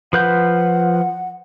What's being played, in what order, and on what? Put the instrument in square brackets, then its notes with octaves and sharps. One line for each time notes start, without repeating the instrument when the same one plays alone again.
[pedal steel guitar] F3 B4 G6 [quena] F#5